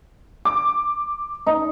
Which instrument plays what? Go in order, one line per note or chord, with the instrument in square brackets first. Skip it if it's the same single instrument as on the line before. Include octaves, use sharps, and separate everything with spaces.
[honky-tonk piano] D6
[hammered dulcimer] D#4